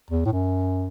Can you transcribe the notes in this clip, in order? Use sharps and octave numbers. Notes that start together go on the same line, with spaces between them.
E2
A2
F#2